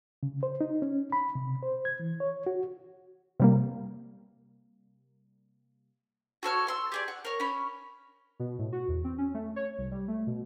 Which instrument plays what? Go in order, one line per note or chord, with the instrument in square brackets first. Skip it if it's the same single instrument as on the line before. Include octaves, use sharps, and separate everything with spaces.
[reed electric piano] C#3
C5
D#4
C#4
B5
C3
C5
G#6
E3
C#5
F#4
[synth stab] C3 G3 A#3
[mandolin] F#4 A4 C#5 F6
A4 C6 E6
G4 G#4 D5
F#5
A#4 C#5
C#4 B5
[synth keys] B2
A2
F#4
E2
C4
C#4
A3
C#5
C2
G3
A3
B2